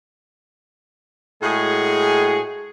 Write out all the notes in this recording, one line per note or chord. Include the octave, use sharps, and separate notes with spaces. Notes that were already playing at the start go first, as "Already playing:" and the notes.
A2 G#3 F#4 G#4